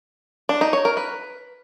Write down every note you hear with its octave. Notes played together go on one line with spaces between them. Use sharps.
D4
D#4
C#5
A#4
B4